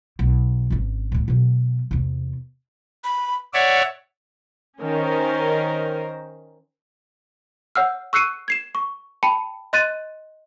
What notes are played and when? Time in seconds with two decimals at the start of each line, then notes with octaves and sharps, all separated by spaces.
0.19 B1
0.70 G#1 C#4
1.12 D2 A2
1.28 B2 F#3
1.91 E2 C3
3.04 B5
3.54 C#5 D5 E5 F#5
4.80 D#3 C#4 A#4 C5 D#5
7.76 C#5 F#5 E6 F6
8.13 C#6 E6 F#6 C7 C#7 D#7
8.48 G#6 C7 E7
8.75 C#6
9.23 G5 A5 B5 C#7
9.73 D#5 C6 F#6 A6 D#7